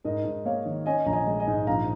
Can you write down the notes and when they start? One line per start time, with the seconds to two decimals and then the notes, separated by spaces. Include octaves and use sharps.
0.04 G#2 A#4 D#5
0.25 G#2
0.45 A#3 C#5 F5
0.66 D#3
0.86 C#4 D#5 G#5
1.06 A#1 A#5
1.13 D#5 G#5
1.27 G#3
1.40 D#5 G#5
1.47 G#2
1.67 A#1 F5 A#5